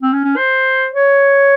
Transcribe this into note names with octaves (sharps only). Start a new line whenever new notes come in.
C4
C#4
C#4
C5
C#5